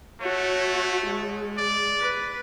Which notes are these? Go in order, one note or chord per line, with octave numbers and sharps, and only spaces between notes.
A3 F#4 C#5
G#3
D5
B4